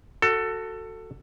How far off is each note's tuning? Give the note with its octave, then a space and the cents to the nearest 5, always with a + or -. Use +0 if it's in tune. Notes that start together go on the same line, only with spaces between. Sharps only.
F#4 +0 A4 +20